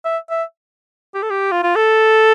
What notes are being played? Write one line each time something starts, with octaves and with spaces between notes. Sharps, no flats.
E5
E5
G4
A4
G4
F4
F4
A4